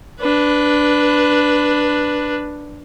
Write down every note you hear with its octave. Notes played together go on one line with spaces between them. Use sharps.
D4 B4